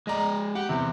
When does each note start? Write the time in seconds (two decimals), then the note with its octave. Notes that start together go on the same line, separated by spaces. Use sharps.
0.07 G#3 D5 D#5 A#5
0.55 G4 F#5
0.69 C3 E3 B3